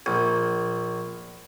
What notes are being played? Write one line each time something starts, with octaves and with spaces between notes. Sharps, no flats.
A#1